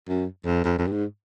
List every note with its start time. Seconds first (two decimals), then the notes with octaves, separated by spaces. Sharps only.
0.08 F#2
0.45 F2
0.64 F2
0.78 F2
0.87 G2
0.92 G#2